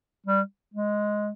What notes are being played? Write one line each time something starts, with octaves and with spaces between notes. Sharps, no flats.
G3
G#3